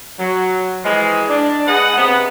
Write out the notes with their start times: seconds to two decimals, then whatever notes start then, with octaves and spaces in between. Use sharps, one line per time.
0.20 F#3
0.85 E3 F3 G#3
1.29 D4
1.68 G#3 B4 D#5 F#5
1.97 C3 B3